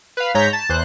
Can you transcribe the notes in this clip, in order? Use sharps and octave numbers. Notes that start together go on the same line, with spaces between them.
B4 F5
G#2 C#5 A#5 G6 B6
A5
E2 C5 F#6